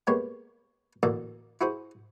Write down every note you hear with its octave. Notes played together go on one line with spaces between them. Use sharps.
G#3 A#3 B3 G4 C#5
A1 D2 A#3 A4 D5
E4 F#4 G#4 C5